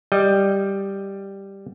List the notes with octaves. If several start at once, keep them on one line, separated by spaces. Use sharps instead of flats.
G3 D#5